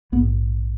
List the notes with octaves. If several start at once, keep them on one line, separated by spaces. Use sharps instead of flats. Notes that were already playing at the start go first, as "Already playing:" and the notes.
A#1 G#2 B3